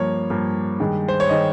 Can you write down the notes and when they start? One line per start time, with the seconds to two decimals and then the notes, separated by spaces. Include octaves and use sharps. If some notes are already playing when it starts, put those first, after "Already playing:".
Already playing: G2 F3 A#3 C#5
0.30 G2 F3 A#3
0.80 G2 D#3 G#3
1.09 C5
1.20 C#5
1.29 D#3 G#3 D#5